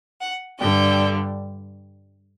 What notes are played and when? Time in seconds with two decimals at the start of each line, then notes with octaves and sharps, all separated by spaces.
0.20 F#5
0.59 G2 D3 G3 G5